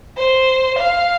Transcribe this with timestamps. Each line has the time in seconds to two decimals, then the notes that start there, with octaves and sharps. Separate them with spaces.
0.17 C5
0.78 F5